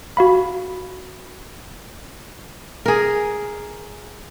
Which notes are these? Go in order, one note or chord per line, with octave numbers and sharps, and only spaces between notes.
F#4 F5 B5
G#4 A#4